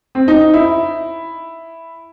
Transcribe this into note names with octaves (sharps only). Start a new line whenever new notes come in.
C4
D#4
E4